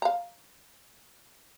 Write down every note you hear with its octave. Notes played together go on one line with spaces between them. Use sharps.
F5 A#5